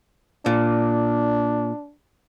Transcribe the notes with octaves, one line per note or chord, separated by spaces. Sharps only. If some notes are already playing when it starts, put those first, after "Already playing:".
A#2 D4